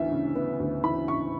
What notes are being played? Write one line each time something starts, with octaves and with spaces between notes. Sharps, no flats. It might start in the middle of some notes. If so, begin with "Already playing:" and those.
Already playing: D2 E3 B3 E5
C#3
B3
D2
E3 B5
C#3 C#6